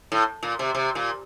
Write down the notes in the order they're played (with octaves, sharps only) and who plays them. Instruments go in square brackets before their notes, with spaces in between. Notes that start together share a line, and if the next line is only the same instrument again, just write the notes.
[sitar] A2
A#2
C3
C3
A#2